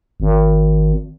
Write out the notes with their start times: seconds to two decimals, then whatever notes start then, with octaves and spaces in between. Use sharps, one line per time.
0.20 G#1